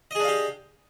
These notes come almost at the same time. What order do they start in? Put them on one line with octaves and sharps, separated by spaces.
D#5 G#4 D4 F5 G4